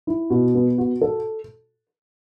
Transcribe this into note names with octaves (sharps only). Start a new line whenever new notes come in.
E4
B2
B3
F#4
A4